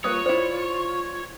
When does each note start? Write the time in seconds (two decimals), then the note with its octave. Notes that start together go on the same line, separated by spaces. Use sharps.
0.04 G3 A#3 F4 B4 C#5 D#6
0.26 E4 C5 D5